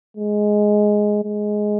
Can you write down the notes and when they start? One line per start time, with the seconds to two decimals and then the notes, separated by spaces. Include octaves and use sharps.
0.17 G#3
1.23 G#3